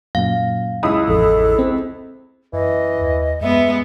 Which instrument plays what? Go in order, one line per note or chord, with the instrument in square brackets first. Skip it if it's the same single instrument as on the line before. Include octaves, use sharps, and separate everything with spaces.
[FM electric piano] F#2 A#2 [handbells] F5
[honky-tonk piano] C#2 E4 D#6
[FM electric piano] A1 F2 [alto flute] A4
[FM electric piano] C4
[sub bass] F#2 [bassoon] E3 [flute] D#5
[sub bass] D#2
[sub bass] F#2 [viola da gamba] G#3 B3 [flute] E5